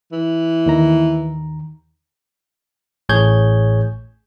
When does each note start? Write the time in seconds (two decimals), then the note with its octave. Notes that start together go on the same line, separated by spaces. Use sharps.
0.12 E3
0.66 D#2 D#3 A#5
3.09 A1 A2 G#4 C#5 G6 G#6